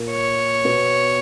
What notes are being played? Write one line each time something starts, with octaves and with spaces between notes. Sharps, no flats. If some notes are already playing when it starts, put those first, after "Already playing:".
Already playing: A#2 A#3
C#5
B2 B3